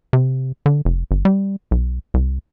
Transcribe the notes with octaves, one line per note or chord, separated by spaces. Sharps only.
C3
D3
F1
G1
G3
B1
C2